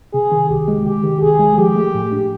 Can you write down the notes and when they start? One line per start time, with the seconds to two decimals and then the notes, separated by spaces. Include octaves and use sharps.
0.14 C3 G#4
0.32 D#3
0.50 C2 G4
0.68 G#3
0.86 C3 G4
1.04 D#3
1.22 C2 G#4
1.39 G#3
1.58 F3 G4
1.75 A3
1.94 A2
2.12 D4